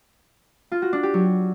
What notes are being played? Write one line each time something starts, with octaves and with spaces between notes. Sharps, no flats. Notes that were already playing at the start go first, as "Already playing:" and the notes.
F4
F#4
D4
G4
F#3